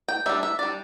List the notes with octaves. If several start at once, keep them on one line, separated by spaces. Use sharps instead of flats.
G5
G3 D4 E5
E5
G3 D4 D5